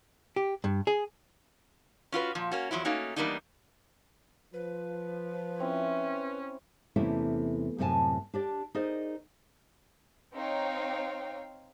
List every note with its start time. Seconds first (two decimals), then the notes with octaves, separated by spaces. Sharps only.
0.36 G4
0.64 G2
0.87 G#4
2.12 C#4 F4 F#4 B4
2.35 A#2 F3
2.51 A#3 C#4 F#4
2.71 E2 F3 F#3 E4
2.85 A3 A#3 C#4 D#4 F#4
3.16 E3 G3 A#3 B3 D4 D#4
4.54 F3 B4
5.60 C4 C#4 E4
6.96 E2 C3 A3 A#3 C#4 E4
7.78 F#2 A2 C3 D#5 G#5 A5
8.34 D4 G4 D5
8.75 D#4 G#4 A#4 C5 D5 D#5
10.33 C4 D#4 C#5 F5 G5